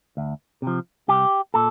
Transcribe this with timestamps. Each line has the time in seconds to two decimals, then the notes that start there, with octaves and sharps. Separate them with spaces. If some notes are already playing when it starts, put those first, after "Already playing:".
0.17 D2
0.62 C3 F3
1.08 C2 G4
1.54 A#2 A4